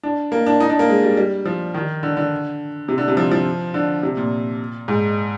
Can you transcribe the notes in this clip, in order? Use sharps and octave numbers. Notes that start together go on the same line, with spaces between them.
D4
A#3
D4
D#4
D4
A#3
G#3
G3
G3
F3
D#3
D3
D3
C3
D3
C3
F3
F3
D3
C3
A#2
G#2